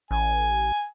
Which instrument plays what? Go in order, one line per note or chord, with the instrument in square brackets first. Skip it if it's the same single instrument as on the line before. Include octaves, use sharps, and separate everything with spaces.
[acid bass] A1 [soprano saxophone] G#5